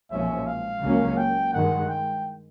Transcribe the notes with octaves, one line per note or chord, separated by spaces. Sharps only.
B1 A#2 F3 G#3 C#4 E5
F5
C#2 C#3 F#3 A#3 C#4
G5
G2 D#3 G#3 F#5
G5